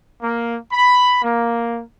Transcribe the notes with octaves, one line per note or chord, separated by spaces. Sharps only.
A#3
B5
A#3